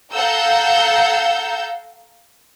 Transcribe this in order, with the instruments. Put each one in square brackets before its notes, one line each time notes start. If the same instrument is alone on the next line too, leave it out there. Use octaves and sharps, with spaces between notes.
[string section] A4 F5 F#5 A#5 E6 G6